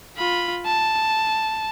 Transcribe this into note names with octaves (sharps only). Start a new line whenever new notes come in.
F4 B5
A5